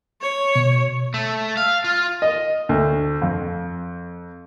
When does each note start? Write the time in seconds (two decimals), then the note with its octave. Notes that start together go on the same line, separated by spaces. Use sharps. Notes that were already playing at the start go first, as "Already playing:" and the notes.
0.22 C#5
0.56 B2
1.14 A3
1.57 F5
1.84 F4
2.22 D#5
2.69 D2
3.22 F2